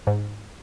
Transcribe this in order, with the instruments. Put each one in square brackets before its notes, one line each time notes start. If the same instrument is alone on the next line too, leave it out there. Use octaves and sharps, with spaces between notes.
[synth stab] G#2